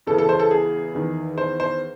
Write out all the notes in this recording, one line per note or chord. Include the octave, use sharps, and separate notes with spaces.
E2 C#3 E3 A4
A4
C5
A4
G#4
E2 D#3
C5
C5